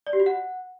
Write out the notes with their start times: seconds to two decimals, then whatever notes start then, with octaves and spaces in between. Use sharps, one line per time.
0.07 D5
0.13 G4
0.20 F#4
0.26 F#5